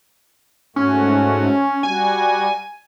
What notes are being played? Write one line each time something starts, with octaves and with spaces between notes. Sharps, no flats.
G#2 A3 C#4 F#4
G3 F#4 G#5